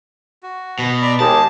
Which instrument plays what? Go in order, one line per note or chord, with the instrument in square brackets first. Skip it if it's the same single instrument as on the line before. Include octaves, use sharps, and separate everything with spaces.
[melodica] F#4
[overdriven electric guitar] B2
[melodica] D5 A#5 B5
[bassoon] D#2 [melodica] G#3 G4 G#4 [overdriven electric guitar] A5